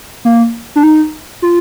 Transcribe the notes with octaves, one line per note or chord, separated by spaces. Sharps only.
A#3
D4
D#4
F4